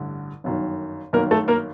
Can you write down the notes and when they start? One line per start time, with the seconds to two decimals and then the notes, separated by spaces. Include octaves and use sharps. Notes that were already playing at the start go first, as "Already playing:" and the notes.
Already playing: A1 G2 D3
0.44 G1 F#2 D#3
1.13 G1 F#2 D#3 A#3 A#4
1.31 A3 A4
1.48 A#3 A#4